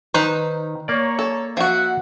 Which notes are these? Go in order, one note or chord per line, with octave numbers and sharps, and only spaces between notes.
D#3 D#4 B4 C5
A#3 A#4 C#5 D5
A4
F3 F#4 E5 F#5